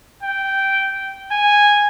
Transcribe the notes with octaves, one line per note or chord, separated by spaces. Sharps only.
G5
G#5